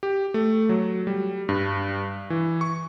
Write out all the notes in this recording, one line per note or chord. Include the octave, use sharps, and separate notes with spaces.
G4
A3
F#3
G3
G2
E3
C#6